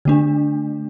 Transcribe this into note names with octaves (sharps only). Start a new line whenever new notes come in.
D3 A3 D4